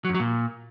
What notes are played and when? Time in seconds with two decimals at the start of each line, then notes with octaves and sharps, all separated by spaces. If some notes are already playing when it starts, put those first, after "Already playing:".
0.05 F#3
0.10 F#2
0.15 F#3
0.20 A#2